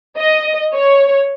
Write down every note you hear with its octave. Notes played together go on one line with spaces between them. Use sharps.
D#5
C#5